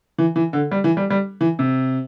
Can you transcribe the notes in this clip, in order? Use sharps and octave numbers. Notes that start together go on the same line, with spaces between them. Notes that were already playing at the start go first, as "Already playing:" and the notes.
E3
E3
D3
G3
E3
G3
G3
E3
C3